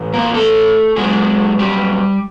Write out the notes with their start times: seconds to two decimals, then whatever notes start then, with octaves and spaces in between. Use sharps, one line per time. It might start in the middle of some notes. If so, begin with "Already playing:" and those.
Already playing: A2 E3
0.14 A#3 A#4
0.34 A3 A4
0.96 A#2 F#3 G#3 G#4
1.59 G3 G4